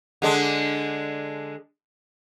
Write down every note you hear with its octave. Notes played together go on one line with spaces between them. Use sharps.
D3 G#3 D4